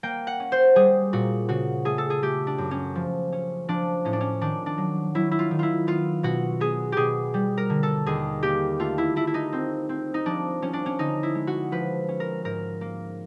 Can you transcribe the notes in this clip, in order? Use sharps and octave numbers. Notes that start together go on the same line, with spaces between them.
A#3 G5
F#5
C#4
C5
G3 G#4
A#2 F#4
C#3 F#4
A3 G#4
A4
G#4
A3 G4
D4
F#2
C#4
F3
C#4
F3 D4
A2 C#4
D4
C#4
D#3 D4
D4
F#3
F#3 E4
E4
F4
D#3
E4 F4
B3 F4
B2 F#4
B3 G#4
B2 G4 G#4
G3
A#4
D3
A4
D#2 G#4
A#3 G4
A3 F4
E4
A3 E4
E4
D#4
C4
C4
D#4
F3 D4
F3 C#4
D4
C#4
D3 D#4
E4
G#3
F#4
F3 B4
C#4
A#4
G#2 A#4
A#3